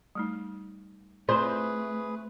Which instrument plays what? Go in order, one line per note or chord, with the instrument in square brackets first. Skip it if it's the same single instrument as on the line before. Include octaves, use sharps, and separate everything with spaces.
[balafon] G3 A3 D#4
[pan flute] A3 [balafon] C4 F4 D5 [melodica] G#4 B4 [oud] C5